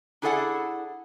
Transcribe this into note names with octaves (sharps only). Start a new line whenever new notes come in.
D4 E4 G#4 A4 D5 F#5